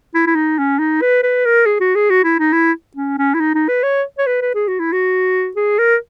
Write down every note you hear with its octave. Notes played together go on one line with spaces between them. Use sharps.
E4
E4
D#4
C#4
D#4
B4
B4
A#4
G#4
F#4
G#4
F#4
E4
D#4
E4
C#4
C#4
E4
D#4
D#4
B4
C#5
C#5
B4
B4
G#4
F#4
E4
F#4
G#4
A#4